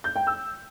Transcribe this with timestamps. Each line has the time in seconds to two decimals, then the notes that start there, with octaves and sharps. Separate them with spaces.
0.04 G6
0.16 G5
0.27 E6